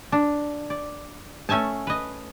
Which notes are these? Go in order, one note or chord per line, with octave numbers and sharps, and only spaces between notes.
D4
D5
A3 C#4 E5 G#5 A5
B4 D#5